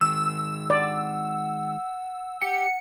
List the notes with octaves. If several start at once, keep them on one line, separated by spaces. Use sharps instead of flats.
D#3 G#3 E6
D5 F#5
G4 F#5 G5 C#7